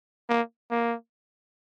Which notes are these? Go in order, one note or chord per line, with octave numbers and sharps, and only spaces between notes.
A#3
A#3